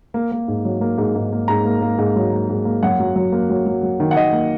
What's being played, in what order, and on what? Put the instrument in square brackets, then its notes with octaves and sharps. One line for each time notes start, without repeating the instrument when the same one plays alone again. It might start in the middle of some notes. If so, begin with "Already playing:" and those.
[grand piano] A#3
A#3
G#2
F#3
A#3
G#2
G#2
A#3
G#2 A#5
A#3
A#3
G#2
F#3
A#3
G#2
A#3
F#2 F#5
F#3
F#3
A#3
F#3
F#3
F#3
D#3
F#5
D#3 D#5
A#3